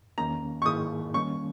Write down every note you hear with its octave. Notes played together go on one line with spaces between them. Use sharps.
E2 D#3 A#3 C#4 A#5
C#6
G#2 D#3 A#3 E4 G#4 D#6
D#3 G3 A#3 C#4 C#6